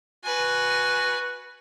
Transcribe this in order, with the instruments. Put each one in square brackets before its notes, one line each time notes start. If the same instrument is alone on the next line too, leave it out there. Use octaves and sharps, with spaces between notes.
[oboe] F#4 [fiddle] B4 G#5